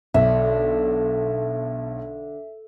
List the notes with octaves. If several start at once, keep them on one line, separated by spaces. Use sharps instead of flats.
B1 D3 E5